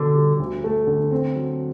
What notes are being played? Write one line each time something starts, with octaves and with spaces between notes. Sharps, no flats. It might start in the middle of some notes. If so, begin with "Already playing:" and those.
Already playing: B2 D3 B3
G3
D2
A3
D3
C4
F#3